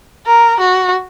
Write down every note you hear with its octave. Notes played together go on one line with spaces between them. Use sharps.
A#4
F#4